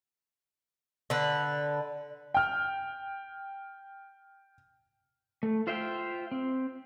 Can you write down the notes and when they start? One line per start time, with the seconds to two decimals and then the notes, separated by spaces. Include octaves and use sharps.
1.10 D3 B4
2.34 G5 F6
5.43 A3
5.67 F4 C5 E5 F5 G5
6.32 C4